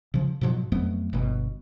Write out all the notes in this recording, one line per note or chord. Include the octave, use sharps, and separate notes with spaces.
C#3 F3
G#2 B2 F3 F#3
F2 F#3 A3 B3
G1 B2